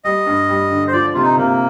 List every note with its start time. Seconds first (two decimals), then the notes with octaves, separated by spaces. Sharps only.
0.04 G3 D#5
0.26 G2
0.49 G3
0.71 D3
0.88 C5
0.93 F3 D5
1.14 C3 F4
1.23 D#4
1.37 C3 A#3